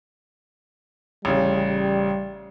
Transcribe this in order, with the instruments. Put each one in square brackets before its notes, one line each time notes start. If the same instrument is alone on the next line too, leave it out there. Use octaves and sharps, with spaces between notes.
[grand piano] A1 C#3 [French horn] G3